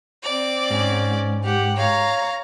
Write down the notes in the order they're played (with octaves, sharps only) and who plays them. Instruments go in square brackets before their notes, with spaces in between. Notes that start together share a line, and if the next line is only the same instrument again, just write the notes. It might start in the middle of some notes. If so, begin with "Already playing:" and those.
[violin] C4 D5
[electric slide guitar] G#2 [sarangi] C#4
[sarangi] G4 [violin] F#5
[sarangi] C#5 [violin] F5 A#5